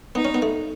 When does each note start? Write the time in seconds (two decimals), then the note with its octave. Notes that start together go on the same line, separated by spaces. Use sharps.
0.15 B3 D#4
0.25 C#4
0.34 B3
0.42 A3